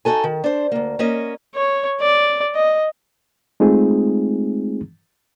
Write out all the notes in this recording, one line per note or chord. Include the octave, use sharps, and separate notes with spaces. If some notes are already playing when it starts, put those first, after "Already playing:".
D#4 F4 F#4 A4 G#5
D#3
D4 C5
D2 A#3
A#3 C#4 C#5 D#5
C#5
D5
D#5
G#3 A3 C4 D#4 F4 G#4